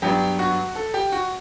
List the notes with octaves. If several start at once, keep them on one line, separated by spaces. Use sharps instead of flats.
G2 F#3 B3 D4 G4
F#4
A4
G4
F#4